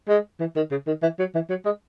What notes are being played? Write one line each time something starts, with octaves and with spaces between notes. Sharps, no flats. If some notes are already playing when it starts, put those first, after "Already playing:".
G#3
E3
D#3
C#3
D#3
E3
F#3
E3
F#3
G#3